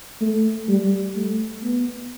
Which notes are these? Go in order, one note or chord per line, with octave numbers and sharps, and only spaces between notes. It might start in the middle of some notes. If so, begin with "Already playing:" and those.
A3
G3
A3
B3